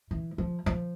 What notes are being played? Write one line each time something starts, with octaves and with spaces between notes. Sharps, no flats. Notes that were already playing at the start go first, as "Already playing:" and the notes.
E3
F3
F3